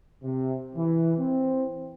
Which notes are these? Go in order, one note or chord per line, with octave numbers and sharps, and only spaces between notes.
C3
E3
C4